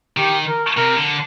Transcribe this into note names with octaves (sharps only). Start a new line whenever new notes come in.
D#3 G4
A#4
C3 A#4
D3